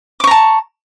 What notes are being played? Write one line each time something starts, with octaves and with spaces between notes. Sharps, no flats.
A5 A#5 C#6 D6